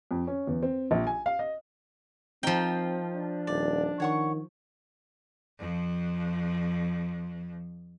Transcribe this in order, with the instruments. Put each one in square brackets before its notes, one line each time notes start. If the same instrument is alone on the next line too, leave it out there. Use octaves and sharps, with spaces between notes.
[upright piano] F2
C#4
E2
C4
A#1
G#5
F5
D#5
[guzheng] F3 G5 [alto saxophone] C4 [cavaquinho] D#4 A#4 A#5
[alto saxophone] D4
[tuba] D#1 [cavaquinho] D5
[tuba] D#3 [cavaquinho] C#5 F#5 C#6
[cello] F2 F3